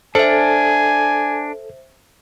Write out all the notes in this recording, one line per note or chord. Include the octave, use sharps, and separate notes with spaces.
D4 A4 C5 E5 G#5